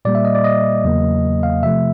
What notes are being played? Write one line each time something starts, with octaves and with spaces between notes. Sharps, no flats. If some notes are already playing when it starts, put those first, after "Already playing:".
A#2 G3 A#3 D5
E5
D#5
D5
D#5
E2 C#3 F#3 A#3
F5
C3 F3 A3 E5